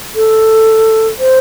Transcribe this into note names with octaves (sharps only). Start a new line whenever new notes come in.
A4
C5